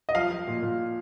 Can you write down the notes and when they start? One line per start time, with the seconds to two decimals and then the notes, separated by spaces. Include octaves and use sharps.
0.09 D#5
0.15 F3 F5
0.31 F3
0.48 A#2
0.63 A#2